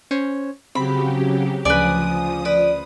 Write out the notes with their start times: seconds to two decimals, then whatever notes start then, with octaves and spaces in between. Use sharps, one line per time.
0.11 C#4 C5 C#5
0.75 C#3 F#3 C4 G4 B5
1.65 D2 C#3 F3 B4 D5 G#5 D#6
2.45 B4 D5